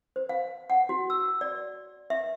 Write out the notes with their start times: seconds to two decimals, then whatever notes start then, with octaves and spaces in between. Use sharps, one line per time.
0.16 C5
0.29 F5
0.70 F#5
0.89 F#4
1.10 E6
1.41 D5
2.10 E5